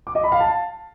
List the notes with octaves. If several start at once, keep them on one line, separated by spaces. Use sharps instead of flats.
D6
D#5
B5
F5
A5